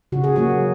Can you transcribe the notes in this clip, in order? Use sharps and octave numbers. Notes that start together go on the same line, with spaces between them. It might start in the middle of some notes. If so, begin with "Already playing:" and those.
C#3 F#4
G#4
F#3 A#3 F#4